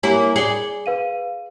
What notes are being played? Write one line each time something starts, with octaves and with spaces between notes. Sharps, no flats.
A#3 E4 G4 C#5 G#5
G#4 D5 C#7 G7
B4 F5 D#7